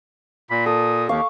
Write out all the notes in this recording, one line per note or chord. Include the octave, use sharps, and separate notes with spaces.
A#2 B5
A4 D#6
D#2 F5 C#6 D6